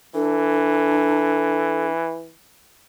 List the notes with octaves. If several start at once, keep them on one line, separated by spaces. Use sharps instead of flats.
E3 D4 A4